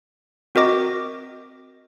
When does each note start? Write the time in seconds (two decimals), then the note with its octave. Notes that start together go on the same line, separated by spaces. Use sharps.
0.55 C4 F#4 A#4 D#5 D6 A#6